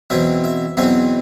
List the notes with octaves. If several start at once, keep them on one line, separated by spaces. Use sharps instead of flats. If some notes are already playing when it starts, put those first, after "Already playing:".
E2 B2 F#3 C4 E5
E5
E2 B2 F#3 C4 E5